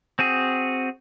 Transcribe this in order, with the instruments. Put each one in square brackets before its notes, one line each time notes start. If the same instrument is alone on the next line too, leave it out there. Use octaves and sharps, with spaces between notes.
[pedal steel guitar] C4 F#4 G#4